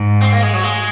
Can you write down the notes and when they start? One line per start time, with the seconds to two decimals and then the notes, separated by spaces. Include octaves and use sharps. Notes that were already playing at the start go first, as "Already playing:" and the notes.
Already playing: G#2
0.22 C4
0.33 A#3
0.43 G#3
0.53 F#3
0.63 G#3